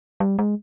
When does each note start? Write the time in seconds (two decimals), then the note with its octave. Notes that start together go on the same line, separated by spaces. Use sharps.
0.20 G3
0.39 G#3